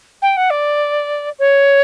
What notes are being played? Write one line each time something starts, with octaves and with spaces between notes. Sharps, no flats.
G5
F#5
D5
C#5